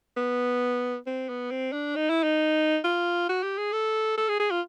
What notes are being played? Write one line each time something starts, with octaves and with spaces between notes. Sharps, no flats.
B3
C4
B3
C4
D4
D#4
E4
D#4
F4
F#4
G4
G#4
A4
A4
G#4
G#4
F4